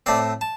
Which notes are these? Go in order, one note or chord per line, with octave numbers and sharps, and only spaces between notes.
A2 A3 C4 D5
A5